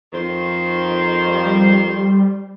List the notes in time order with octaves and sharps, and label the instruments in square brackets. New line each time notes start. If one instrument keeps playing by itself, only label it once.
[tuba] F2 [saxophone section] D#3 C5
[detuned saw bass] G3